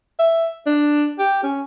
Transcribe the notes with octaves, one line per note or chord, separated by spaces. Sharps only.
E5
D4
G4
C#4